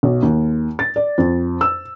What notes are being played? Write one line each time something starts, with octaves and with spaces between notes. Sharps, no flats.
B1
D#2
A6
D5
F2
E6